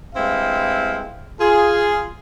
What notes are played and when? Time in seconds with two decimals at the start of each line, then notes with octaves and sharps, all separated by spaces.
0.16 G2 G#3 C4 E4 F5 G5
1.41 F4 G#4